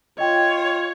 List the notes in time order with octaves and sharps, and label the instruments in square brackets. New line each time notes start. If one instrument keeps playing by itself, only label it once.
[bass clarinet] F4 [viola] C#5 [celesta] D#5 G5